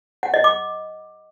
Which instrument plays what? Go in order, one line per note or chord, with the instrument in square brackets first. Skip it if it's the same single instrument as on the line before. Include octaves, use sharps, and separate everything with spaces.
[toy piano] F#5
D#5
D6